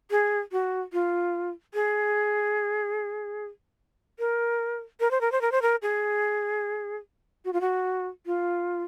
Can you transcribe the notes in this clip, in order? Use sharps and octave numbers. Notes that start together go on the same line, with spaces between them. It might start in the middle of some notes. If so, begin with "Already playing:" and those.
G#4
F#4
F4
G#4
A#4
A#4
C5
A#4
C5
A#4
C5
A#4
G#4
F#4
F4
F#4
F4